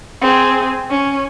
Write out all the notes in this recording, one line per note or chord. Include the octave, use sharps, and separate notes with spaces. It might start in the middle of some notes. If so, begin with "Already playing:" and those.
C4 G#4
C#4